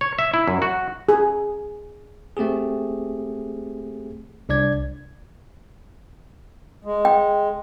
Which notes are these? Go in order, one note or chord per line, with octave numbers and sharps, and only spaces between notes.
C#5
E5
E4
F#2
F#4
G#4
A3 C4 G4 G#4
C2 D4 D5 G#6
G#3
G5